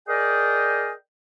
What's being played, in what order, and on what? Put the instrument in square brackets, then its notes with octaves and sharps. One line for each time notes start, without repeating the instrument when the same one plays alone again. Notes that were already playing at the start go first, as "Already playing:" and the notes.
[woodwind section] G#4 A#4 D5 D#5 G5 G#5